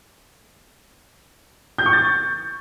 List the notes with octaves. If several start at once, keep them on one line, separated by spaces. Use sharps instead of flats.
G6
C#6
A6